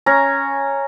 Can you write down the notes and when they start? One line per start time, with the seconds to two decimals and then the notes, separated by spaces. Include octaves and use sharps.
0.06 C#4 A#5